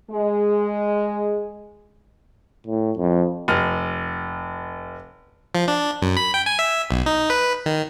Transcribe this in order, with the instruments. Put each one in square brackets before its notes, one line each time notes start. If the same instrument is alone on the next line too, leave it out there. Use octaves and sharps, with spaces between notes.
[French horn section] G#3
[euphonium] A2
F2
[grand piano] F1 F6
[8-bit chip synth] F3
D4
F#2
B5
G5
G#5
E5
B1
D#4
B4
D#3